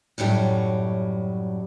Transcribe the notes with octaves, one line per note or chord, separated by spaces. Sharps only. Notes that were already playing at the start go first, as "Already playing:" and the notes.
F#2 A2 F#3 G3